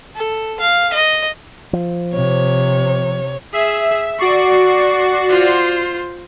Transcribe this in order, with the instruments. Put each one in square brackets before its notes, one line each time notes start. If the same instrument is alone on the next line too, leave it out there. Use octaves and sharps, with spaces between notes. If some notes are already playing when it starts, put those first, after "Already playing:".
[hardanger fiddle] A4
F5
D#5
[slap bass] F3
[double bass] C3 [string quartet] C#5
[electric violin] G#4 [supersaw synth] E5
[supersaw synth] F#4 D5 C7 [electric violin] C#6
[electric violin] F4 C5